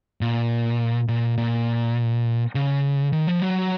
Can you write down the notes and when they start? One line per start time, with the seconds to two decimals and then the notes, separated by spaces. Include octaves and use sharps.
0.21 A#2
1.08 A#2
1.38 A#2
2.55 C#3
3.13 D#3
3.27 F3
3.42 F#3